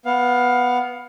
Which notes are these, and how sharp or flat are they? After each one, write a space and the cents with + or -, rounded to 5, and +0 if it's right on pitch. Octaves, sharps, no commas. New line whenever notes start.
B3 +0 F5 +20